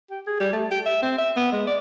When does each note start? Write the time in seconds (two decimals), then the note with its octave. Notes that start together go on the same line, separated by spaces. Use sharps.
0.10 G4
0.27 G#4
0.40 G3
0.53 A3
0.71 G4
0.86 E5
1.02 C4
1.18 E5
1.36 B3
1.52 G#3
1.67 D5